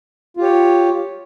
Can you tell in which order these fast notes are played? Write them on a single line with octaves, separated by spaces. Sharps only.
F4 G4 C#5